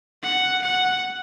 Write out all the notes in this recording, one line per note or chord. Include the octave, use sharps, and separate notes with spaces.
F#5
F#5